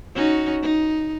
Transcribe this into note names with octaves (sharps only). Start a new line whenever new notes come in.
C#4 D#4 F#4
D#4